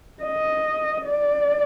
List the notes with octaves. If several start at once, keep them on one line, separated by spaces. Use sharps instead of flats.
D#5
D5